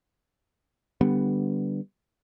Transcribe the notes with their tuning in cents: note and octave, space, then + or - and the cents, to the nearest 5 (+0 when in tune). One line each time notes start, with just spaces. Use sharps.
D3 +0 G3 +0 B3 +0